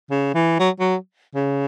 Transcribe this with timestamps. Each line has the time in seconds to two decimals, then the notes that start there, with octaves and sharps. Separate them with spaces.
0.11 C#3
0.35 E3
0.60 F#3
0.80 F#3
1.35 C#3